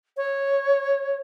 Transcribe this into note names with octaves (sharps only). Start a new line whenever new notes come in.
C#5